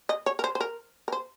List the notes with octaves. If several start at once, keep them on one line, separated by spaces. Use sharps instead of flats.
D#5
C#5
A#4
C5
C5
A#4
A#4
C5